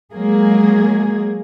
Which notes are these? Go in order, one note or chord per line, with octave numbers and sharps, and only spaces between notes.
F#3 G#3 A#3 G#4